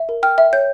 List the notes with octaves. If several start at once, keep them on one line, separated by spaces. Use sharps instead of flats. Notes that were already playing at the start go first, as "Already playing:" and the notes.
Already playing: E5
A#4
G5 F6
E5
C#5 G6